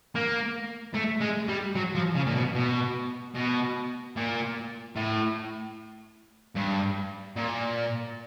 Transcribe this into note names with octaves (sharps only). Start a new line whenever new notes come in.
A#3
A3
G#3
G3
F#3
F3
C#3
A#2
B2
B2
B2
A#2
A2
G2
A#2